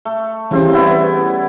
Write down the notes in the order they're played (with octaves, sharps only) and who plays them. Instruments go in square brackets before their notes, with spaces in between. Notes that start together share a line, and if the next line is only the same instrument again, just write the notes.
[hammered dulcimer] A3
[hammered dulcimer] C#3 C4 C5 [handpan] E3 G3
[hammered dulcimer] B3 E4